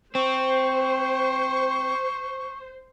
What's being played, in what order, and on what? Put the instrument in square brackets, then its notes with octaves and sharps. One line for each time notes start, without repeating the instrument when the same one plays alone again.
[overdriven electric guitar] C4 [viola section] C5 [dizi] C#6